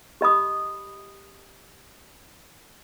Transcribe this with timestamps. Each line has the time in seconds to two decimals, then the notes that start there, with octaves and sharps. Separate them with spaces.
0.21 G4 D#5 B5 D#6